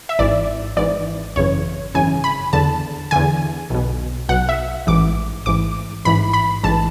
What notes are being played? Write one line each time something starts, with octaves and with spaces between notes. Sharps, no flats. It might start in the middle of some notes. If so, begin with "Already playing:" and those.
E5
G#1 G#2 E3 D5
G#1 G#2 E3 D5
G#1 F#2 C#3 E3 C#5
G#1 F#2 C#3 E3 G#5
B5
E2 D3 A5
E2 D3 G#5
B1 B2
B1 B2 F#5
E5
A1 G#2 E3 D6
A1 G#2 E3 D6
A1 G#2 E3 B5
B5
A1 G#2 E3 A5